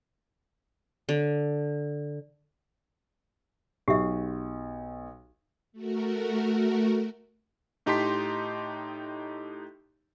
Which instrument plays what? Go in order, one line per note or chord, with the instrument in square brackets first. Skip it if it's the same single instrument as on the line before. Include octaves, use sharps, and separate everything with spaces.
[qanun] D3
[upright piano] B1 [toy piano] G4 E5
[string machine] A3 F#4 A#4
[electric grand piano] A2 D#4 G4 A5 C6 B6